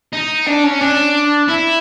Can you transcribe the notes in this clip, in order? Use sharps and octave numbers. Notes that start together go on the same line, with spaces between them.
D#4
D4
C#4
D4
E4